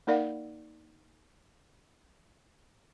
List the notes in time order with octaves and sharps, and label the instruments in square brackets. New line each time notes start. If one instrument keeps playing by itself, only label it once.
[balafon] A#3 D#4 A#4 D5 F5 F#5